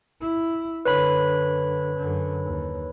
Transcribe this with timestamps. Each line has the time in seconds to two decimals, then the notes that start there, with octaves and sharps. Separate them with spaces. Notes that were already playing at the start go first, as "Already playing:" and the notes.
0.21 E4
0.85 F#2 D3 B4 C#5 B5
1.96 F#2 D3
2.45 D#2